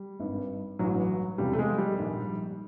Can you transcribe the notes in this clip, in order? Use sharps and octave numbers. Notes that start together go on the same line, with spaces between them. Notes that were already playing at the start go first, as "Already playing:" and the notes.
Already playing: G3
G#1 G2 D#3
A1 G2 E3 F#3
E2 C3 F3 G3
A3
G#3
G3
A#1 G#2 D#3